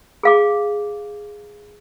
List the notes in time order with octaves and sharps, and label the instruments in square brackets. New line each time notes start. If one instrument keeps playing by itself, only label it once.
[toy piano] G#4 F5 D6